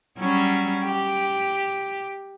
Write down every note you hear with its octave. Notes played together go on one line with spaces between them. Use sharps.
F#3 G3 C#4
G4